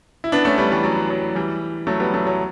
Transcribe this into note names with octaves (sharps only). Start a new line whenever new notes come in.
E4
B3 D4
A3 C#4
G3 B3
E3 G3
F#3
F#3
E3 G3
F#3 A3
G3 B3
F#3 A3
F#3